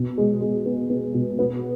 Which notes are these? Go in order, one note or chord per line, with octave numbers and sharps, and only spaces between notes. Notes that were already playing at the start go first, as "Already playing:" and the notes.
Already playing: B2
G#3
G#3
B3
B3
B2
B3